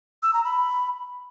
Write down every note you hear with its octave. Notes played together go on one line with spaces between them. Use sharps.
E6
A#5
B5